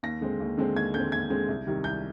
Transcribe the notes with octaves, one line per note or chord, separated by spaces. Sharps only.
D#2 A#6
D3 G#3 C4
D#2
D3 G#3 C4
D#2 G#6
D3 G#3 C4 G6
D#2 G#6
D3 G#3 C4
C2
C3 D#3 G3
C2 G6